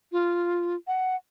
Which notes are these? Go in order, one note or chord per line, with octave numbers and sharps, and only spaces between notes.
F4
F#5